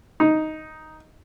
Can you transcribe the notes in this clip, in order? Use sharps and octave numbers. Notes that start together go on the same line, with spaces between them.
D#4